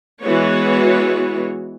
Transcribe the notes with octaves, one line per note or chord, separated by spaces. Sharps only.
E3 G#3 B3 F#4 C#5